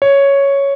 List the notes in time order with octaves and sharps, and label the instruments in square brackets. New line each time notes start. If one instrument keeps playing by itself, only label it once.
[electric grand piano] C#5